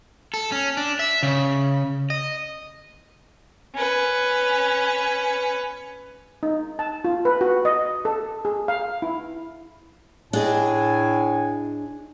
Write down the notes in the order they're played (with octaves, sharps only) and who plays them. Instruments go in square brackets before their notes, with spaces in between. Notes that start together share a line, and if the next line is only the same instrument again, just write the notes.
[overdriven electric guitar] A4
C#4
D4
E5
C#3
D#5
[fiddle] C#4 B4
[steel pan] D#4
A5
F4
B4
F#4
D#5
A4
G#4
F5
E4
[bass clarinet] A2 [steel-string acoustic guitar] D4 G#4 D#5 [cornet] G#5